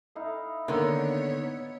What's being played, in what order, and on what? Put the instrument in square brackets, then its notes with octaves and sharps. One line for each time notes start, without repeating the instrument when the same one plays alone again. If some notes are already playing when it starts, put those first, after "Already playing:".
[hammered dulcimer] D#4 E4 F5
[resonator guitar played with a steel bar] D3 D#3 [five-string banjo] A#3 A#4 [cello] B3 C#5